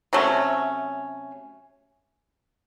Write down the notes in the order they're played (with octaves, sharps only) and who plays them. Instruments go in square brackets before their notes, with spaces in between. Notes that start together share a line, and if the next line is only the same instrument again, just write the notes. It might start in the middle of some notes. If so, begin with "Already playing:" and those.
[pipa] C3 F#3 A3 C#4